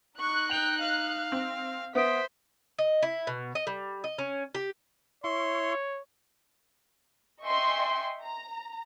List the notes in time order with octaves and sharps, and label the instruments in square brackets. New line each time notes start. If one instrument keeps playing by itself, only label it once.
[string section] D#4 F#6 [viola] C#6
[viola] G5 [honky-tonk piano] F7
[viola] F5
[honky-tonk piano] C4
[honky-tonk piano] B3 [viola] C5 [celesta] E5 D#6 D7 [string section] B6
[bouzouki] D#5
E4
B2
D#5
G3
D#5
C#4
G4
[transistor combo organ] E4 E5 C#6 [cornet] C#5 [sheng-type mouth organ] C6
[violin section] D#5 E5 G5 G#5 C6 C#6
A#5